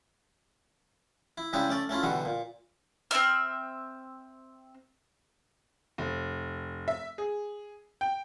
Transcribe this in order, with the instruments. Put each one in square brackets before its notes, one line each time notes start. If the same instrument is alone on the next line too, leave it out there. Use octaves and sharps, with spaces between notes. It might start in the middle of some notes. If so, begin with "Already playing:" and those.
[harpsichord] E4
C#3 G3 G#3 D4 E4 G4
A3 C#4 D5
A3 C#4 E4 F4
B2 D3 E3 G3 F#4
A#2
[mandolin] C4 E4 E5 F6
[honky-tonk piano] F1
E5
G#4
G5